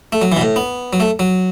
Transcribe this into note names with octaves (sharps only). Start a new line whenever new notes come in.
A3
F#3
E3
B2
A2
B3
F#3
A3
F#3